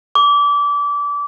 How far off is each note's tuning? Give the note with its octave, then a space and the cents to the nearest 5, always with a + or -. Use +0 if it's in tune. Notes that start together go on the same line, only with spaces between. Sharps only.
D6 -25